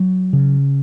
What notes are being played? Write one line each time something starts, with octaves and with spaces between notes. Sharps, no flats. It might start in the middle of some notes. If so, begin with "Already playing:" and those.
Already playing: F#3
C#3